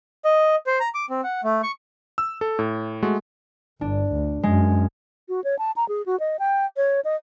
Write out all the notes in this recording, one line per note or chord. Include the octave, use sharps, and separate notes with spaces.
D#5
C5
A#5
D6
C4
F#5
A3
C#6
E6
A4
A2
G#3 A3 F#4
G1 D4
D2
F#2 G#3
F#4
C#5
A5
A#5
G#4
F#4
D#5
G5
C#5
D#5